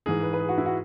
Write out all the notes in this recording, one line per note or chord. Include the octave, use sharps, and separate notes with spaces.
G#2 E3 G#4
B4
B4
G#4
F#4
E4
F#4